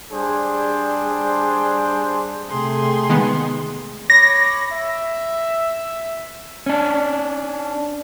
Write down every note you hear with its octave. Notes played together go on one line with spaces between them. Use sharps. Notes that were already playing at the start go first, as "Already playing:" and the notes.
G3 D4 G#4 C5
C3 A3 G#4 C6
D#3 G#3 B3
C#5 B5 D6 A#6
E5
C#4 D4